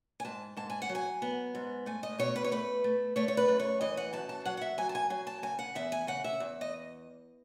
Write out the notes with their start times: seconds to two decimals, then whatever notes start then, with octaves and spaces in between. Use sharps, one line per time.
0.20 G#5
0.25 G#2 A5
0.57 G#2 A5
0.70 G#5
0.82 F#5
0.89 F#3
0.95 G#5
1.22 B3
1.55 G#2
1.86 A3 G#5
2.03 D#5
2.18 B2 C#5
2.36 B4
2.44 C#5
2.51 A3 B4
2.84 A3
3.16 A3 C#5
3.28 C#5
3.37 B4
3.48 F#2
3.59 C#5
3.81 E3 D#5
3.97 F#5
4.13 F#2 A5
4.29 A5
4.45 F#3 F#5
4.57 F#5
4.61 E5
4.78 F#3 G#5
4.89 A5
4.95 G#5
5.10 F#3 G#5
5.27 A5
5.43 C#3 G#5
5.59 F#5
5.75 E2 E5
5.92 G#5
6.07 C#3 F#5
6.24 E5
6.40 E2
6.61 D#5